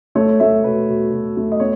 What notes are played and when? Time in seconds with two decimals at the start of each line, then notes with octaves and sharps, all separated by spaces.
0.15 A3 C#5
0.40 A3 E5
0.64 B2 B4
0.88 B2
1.13 B2
1.37 A3
1.52 D#5
1.60 B3 C#5